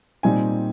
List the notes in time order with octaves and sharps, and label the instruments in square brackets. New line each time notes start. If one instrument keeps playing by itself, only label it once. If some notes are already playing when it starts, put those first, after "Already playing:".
[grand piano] A#2 G3 C4 D#4 G#5